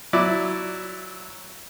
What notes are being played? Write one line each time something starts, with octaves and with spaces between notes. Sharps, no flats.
F#3 E4 D5